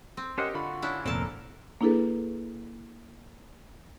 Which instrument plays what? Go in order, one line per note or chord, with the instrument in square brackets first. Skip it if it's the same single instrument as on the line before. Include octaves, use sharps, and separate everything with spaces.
[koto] C4
[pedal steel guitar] C#4 C5 F#5 [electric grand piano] G4 A#4 D#5
[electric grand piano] D3 F4 B5 [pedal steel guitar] F#4
[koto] C#4 D4 E4
[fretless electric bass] F1 A#2 [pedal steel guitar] C4 A#4 [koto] A4 A5
[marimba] A#3 D4 E4 G#4 A4 B4